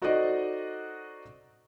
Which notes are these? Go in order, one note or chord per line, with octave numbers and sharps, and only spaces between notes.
D#4 F#4 A4 C5 D5 D#5